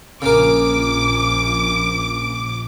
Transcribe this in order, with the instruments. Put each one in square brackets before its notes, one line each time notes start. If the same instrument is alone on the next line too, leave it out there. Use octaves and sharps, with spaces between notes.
[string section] A#1 D6 [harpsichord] C#3 A#4